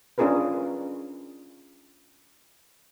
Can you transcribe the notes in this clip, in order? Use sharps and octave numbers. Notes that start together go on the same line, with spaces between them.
C#4 D4 F4 G#4 A#4 B4